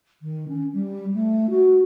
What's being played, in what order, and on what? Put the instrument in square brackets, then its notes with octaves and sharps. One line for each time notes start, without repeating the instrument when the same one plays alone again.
[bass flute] D#3
C#4
G3
A3
F#4